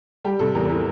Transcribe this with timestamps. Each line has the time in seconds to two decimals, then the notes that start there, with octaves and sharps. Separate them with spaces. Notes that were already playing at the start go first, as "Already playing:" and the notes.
0.24 G3 G4
0.39 C3 A4
0.55 E2 A#4
0.69 E3 A#4